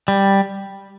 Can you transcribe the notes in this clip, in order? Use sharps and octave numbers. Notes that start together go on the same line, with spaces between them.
G3